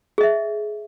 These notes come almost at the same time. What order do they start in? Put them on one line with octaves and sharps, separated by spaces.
G#4 D#5 E5